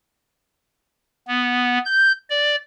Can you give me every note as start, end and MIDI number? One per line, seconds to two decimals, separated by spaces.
1.28 1.79 59
1.85 2.12 91
2.29 2.55 74